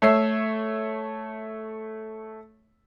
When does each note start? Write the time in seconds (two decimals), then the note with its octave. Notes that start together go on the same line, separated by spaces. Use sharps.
0.02 A3 C#5 E5 E6 C7